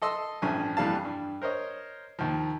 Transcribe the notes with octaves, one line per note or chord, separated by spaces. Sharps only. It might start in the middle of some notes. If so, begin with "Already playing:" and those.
A4 D#5 C6 E6
A1 G2 F3 G#5
F2 E3 G3 F5 A5
G2
A#4 C5 C#5 D#5
D#2 F3